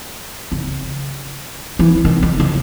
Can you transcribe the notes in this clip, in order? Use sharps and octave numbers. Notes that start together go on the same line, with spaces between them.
C#3
E3
D#3
D#3
C#3